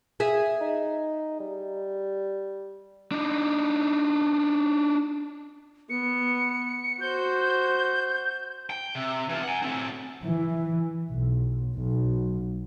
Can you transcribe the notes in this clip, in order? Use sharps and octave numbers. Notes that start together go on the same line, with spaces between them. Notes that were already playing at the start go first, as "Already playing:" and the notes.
G#4 E5
D#4
G3
D4 D#4
B3 C#7
F#4 C5 G6
G5
C3
E3 F4
F#5 G#5
A2 C4
E3
B1
B1